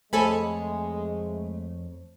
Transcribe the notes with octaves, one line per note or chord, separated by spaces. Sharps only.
F2 G#3 A3 A4 C#5 G#5 B5